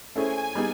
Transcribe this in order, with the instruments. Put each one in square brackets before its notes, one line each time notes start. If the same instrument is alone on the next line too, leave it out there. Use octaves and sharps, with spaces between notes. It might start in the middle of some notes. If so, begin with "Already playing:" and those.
[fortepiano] A3 C#4 E4 G#4 C5 [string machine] G#5
[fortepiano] G3 B3 D#4 G#4